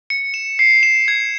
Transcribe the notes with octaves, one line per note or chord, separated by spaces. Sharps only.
C#7
E7
C7
E7
G#6